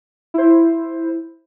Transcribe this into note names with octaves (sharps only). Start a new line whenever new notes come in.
E4 C5